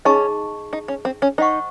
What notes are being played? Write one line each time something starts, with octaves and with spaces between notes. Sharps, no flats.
C#4 D#4 G#4 D#5 A5 C#6
D#4
C#4
C4
C#4
D#4 C5 D#5 F#5 C#6